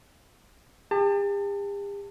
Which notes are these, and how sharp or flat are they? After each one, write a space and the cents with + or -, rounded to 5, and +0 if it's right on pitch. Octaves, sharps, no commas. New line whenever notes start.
G4 +45 A5 +30